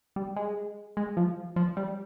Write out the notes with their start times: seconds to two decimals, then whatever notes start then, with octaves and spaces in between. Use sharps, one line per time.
0.16 G3
0.36 G#3
0.97 G#3
1.17 F3
1.56 F3
1.77 G3